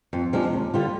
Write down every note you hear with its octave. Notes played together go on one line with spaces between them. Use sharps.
F2
C3 F3 G#3 D4
D#2
D3 G3 D4 F4